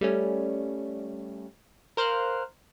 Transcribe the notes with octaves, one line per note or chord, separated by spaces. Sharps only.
G3 A3 C#4
A#4 C5 F5 F6 F#6